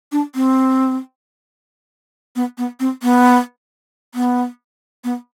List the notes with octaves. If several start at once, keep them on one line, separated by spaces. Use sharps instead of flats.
D4
C4
B3
B3
C4
B3
B3
B3